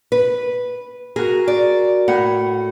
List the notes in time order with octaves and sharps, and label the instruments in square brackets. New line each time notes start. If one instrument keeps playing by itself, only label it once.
[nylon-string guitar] B4
[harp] F#4 A#4 [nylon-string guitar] G#4
[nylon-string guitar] D5
[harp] A2 [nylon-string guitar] F#5